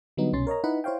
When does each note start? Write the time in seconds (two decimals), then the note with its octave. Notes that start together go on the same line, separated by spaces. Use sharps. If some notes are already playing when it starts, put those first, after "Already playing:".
0.17 D3 F#3 G3 B3 D#4
0.33 C2 B2 C#4 C6 A6
0.47 A#4 C#5 D#5 A#5
0.64 D#4 E4 B4 F#5 B5
0.84 E4 C5 C#5 F5 G5